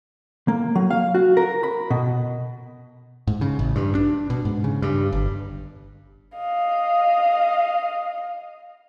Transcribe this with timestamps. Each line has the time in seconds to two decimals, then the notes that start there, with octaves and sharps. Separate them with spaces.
0.48 A#3
0.75 F#3
0.90 F5
1.14 F#4
1.37 A#4
1.63 B5
1.90 B2
3.27 G#2
3.41 C#3
3.59 A1
3.76 G2
3.95 D4
4.30 B2
4.45 G#2
4.64 C#3
4.82 G2
5.12 G1
6.38 D#5 F5